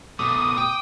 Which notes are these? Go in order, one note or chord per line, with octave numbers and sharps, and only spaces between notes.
B2 A3 D6 D#6
G5